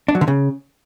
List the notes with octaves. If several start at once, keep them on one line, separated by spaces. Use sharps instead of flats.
D4
F#3
D3
C#3